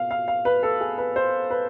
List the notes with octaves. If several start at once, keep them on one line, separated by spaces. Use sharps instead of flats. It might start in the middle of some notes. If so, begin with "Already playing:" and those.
Already playing: B2 F5
F5
F5
B4
A4
G#4
B4
C5
B4